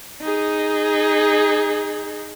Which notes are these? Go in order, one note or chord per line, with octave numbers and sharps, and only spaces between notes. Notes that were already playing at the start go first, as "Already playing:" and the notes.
D#4 G#4